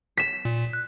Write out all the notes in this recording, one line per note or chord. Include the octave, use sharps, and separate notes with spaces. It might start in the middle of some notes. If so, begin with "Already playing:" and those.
B6 E7
A#2
F#6